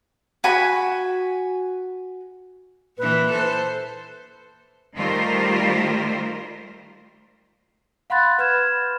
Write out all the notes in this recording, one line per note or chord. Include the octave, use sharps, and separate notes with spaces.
F#4 G#5 B5
A#2 E3 B4
A4 C5
D#3 G3 A3 F4 A#4 C5
F5 F#5 B5 C6 F#6 A6
B4 B5 F6 G6 G#6 E7